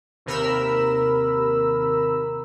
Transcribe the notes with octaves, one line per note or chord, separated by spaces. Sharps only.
D#2 C3 A#4 B5 E6